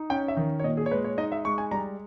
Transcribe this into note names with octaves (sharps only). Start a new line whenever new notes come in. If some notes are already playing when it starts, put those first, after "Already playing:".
Already playing: D#4
C#4 G5
E5
D#3
C#5
A#2 D#5
G#4
C#5
G#3 B4
C#5
D#4 D#5
E5
G#3 C#6
G#5
G3 A#5